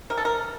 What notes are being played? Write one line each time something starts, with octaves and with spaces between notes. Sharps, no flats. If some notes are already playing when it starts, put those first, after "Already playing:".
C3 A#4
A4
A#4